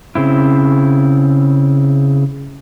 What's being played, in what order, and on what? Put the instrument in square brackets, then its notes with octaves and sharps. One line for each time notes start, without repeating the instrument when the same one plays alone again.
[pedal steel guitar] C#3 C4 E4